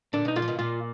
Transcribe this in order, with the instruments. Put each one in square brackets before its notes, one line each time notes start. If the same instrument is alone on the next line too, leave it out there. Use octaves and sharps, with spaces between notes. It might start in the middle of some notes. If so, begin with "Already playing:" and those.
[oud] A#2 D3 [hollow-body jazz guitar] D4
[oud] B2 [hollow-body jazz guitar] D#4
[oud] A#2 D3 [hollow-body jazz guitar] F4
[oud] F3
B2 D#3
[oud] A#2 [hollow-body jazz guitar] F4